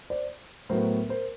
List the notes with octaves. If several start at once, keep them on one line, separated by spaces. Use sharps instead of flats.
C5 D5
A2 F#3 B3 A#4 C5
A#4 C5